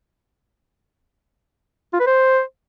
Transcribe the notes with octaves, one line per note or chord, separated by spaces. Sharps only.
F4
B4
C5